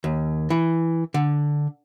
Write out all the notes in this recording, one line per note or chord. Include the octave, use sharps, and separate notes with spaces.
D#2
E3
D3